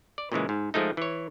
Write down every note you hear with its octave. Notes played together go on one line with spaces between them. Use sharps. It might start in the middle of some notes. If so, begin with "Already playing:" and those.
D5
A#2 C#3 E3 G#3
G#2
F3 G#3 A3 D#4
E3 C#5